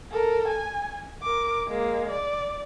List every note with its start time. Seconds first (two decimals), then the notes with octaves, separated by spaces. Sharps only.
0.11 A4 A#4
0.48 G#5
1.23 A#4 D6
1.68 G#3 A#3
2.10 D5